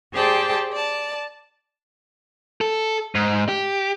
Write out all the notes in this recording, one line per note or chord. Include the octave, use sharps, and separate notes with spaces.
G4 G#4 C5 D5 G5 A5
D5 A5
A4
G#2
G4